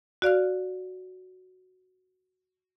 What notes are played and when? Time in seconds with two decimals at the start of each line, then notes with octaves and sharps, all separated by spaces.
0.22 F#4 D5 F5 F6